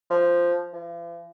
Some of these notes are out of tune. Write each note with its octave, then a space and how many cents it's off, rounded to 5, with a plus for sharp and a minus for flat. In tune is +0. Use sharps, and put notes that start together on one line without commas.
F3 -5
F3 -45